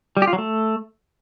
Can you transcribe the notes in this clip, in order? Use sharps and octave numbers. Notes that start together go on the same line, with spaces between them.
G3
G4
F4
F#3
A3